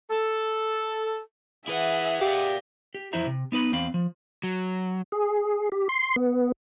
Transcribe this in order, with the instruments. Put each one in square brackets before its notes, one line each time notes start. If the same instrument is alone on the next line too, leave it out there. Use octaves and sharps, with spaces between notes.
[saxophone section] A4
[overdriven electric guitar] E4 B4 [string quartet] G#4 F#5 [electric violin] E5
[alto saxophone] G4 [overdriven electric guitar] D5 F5
[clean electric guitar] G4
F2 E3 E4 C5 E5 A#5
C3
B3 D#4 B4 B5
E2 C4 F5 B5
F3
[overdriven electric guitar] F#3
[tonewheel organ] G#4
G4
C6
B3